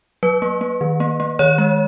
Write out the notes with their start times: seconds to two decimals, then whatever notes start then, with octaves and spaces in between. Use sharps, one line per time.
0.23 F#3 B4
0.42 A#3
0.61 A#3
0.81 D#3
1.00 A#3
1.20 A#3
1.39 D#3 C#5
1.58 G#3